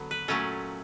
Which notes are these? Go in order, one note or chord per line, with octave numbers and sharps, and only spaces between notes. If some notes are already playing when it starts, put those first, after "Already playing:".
Already playing: D3 F#3 B3
B4
A#2 F#3 A3 C#4